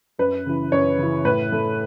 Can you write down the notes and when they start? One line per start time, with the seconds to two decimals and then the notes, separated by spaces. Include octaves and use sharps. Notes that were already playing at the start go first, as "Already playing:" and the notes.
0.19 F#2 B4
0.46 C#3 E3
0.72 F#2 C#5
0.98 C#3 E3
1.25 A2 B4
1.52 A3